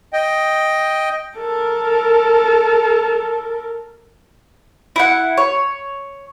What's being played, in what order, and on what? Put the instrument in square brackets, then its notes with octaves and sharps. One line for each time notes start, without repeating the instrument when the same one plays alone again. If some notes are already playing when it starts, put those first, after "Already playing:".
[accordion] D#5 G5
[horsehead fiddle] A4 A#4
[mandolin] E4 F#5
C#5